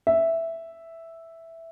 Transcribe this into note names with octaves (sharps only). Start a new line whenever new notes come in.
E5